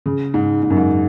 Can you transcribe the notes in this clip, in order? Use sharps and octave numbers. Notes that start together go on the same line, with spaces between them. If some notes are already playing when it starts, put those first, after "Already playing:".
C#3
G#2
G#2
F#2
G#2